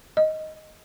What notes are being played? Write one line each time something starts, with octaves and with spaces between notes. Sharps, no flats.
D#5